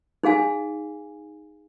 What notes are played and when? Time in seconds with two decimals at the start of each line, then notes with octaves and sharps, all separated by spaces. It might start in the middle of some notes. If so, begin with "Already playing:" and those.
0.23 D#4 G#4 F5 G#5